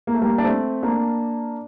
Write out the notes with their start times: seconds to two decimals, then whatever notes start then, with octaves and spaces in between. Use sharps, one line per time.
0.07 A#3
0.14 A3
0.21 G3 A#3
0.38 D4
0.44 A3 C4
0.83 A#3 D4